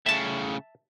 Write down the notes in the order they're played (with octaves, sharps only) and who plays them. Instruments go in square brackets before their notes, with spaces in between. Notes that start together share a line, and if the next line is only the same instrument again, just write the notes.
[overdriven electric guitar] A2 C#3 [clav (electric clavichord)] E5 A5